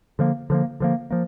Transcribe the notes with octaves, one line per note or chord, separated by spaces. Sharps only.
D3 F3 A#3
D3 F3 A#3
D3 F3 A#3
F3 A#3